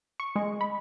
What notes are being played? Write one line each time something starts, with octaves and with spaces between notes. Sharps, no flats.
C#6
G#3
B5